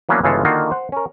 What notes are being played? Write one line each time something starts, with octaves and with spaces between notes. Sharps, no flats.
E3 F#3 A#3 B3 C#4 D4
G1 C#3 E3 G#3 F4 A4
D3 D#3 A#3 D#4 F4 F#4
C5 F#5
C#4 A#4